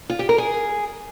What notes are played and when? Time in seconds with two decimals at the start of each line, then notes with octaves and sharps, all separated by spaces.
0.10 F4
0.19 G4
0.29 A#4
0.38 G#4